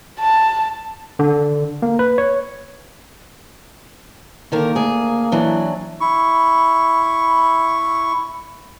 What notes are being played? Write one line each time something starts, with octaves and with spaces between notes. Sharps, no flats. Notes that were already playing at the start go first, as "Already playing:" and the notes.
A5
D3
A#3
B4
C#5
D3 D#3 A#3 A#4
D2 G#4
E3 F#3 D4
E4 C#6